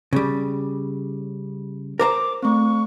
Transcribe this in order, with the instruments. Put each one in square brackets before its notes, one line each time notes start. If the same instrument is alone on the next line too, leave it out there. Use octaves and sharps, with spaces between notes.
[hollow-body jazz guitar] C#3 G3
[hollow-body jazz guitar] A#4 C5 A#5 [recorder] D6
[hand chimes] A3 C4 [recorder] C#6